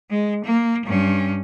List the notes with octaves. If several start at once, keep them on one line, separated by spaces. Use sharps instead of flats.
G#3
A#3
G2 C#4